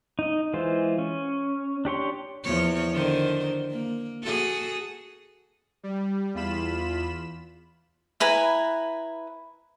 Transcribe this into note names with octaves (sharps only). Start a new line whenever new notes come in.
D#4 D#5
E3 G#3 F4 C5
C#4
D4 G4 C#5 C6
E2 F3 C#5
D3 D#3 C5
A#3
F#4 G#4 A4
G3
E2 F4 B5 E7
E4 B4 G#5 A#5